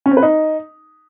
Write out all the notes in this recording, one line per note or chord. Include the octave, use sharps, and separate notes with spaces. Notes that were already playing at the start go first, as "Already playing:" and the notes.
C#4
C4
B4
D#4